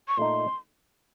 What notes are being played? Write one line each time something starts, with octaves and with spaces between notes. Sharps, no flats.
C#6
A#2 A3 D#4 C6